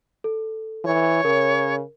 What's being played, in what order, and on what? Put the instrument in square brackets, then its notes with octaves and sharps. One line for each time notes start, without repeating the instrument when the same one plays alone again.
[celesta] A4
[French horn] E3 [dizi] C#5
[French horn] C#3 [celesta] A#4